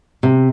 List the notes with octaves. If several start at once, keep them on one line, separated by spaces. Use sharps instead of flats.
C3